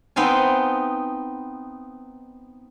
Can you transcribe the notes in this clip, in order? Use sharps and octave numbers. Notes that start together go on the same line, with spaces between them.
B3 C4 D#4 F5 G#5